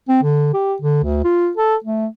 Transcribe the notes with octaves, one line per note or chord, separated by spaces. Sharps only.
C4
D3
G4
D3
D2
F4
A4
A3